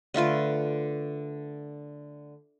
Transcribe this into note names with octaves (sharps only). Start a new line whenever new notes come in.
D3 A3 F4 B4